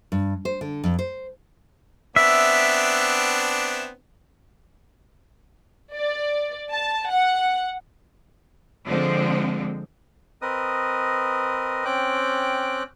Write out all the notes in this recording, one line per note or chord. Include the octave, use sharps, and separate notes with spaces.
G2
C5
D3
F2
C5
B3 C4 D4 E5
D5
A5
F#5
D3 F3 G#3 C4
C4 A#4 B4 D#5 D#6
C4 C#4 G5 D6 F#6